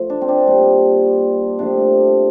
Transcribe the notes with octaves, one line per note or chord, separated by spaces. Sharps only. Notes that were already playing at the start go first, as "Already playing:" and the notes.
Already playing: F3 A3
D4
C4
D4
A#2 G3
C3 F3 A3 D4